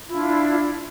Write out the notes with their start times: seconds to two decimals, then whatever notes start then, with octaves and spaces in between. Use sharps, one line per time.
0.05 E4
0.09 F4
0.12 D4